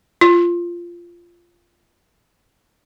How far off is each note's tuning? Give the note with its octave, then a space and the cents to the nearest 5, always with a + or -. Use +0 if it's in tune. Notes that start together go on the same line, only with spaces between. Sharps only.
F4 -15